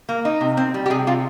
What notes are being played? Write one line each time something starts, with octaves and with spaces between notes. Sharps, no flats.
A#3
D#4
C3
C4
G3
G4
C3 G#4
C3 F4